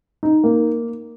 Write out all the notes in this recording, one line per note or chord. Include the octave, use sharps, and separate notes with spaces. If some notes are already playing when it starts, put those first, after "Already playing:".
D#4
A#3